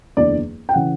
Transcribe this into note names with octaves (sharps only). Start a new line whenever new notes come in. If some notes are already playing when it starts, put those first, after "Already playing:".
F#1 E2 D3 D5
G5
C#3 E3 F#5